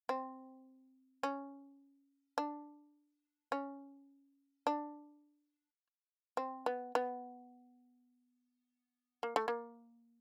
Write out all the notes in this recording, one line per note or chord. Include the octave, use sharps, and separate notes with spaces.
C4
C#4
D4
C#4
D4
C4
B3
B3
A#3
A3
A#3